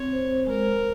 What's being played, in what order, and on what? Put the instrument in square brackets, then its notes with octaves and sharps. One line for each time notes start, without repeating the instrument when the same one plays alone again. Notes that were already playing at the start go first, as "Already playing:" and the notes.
Already playing: [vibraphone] C4 [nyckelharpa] C#5
[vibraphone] C5
[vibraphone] G#3 [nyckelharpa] A#4